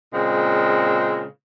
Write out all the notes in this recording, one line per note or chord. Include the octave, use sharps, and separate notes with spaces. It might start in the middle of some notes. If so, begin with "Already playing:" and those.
A#2 C#3 G#3 C4